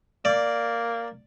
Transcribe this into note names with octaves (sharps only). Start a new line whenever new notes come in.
A#3 D5